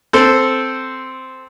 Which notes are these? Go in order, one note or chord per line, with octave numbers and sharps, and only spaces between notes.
C4 A4 C5